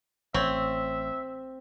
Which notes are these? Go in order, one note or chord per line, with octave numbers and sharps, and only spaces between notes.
A1 C4 C#5 E5